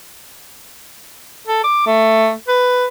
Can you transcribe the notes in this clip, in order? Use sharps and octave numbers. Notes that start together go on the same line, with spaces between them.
A4
D6
A3
B4